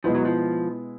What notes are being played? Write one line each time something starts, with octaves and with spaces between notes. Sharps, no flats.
B2 F3 G#3 B3 E4
F#3
F3